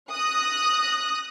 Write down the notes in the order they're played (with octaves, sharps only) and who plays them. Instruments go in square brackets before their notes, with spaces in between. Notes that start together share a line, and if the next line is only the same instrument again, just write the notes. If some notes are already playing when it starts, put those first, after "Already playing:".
[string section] D#6 F#6 A#6